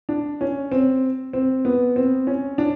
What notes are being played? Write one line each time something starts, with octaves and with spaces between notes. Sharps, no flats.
D4
C#4
C4
C4
B3
C4
C#4
D4